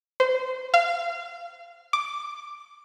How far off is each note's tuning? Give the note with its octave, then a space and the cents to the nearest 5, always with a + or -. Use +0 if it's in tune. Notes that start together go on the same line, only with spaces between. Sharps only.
C5 -25
F5 -25
D6 +5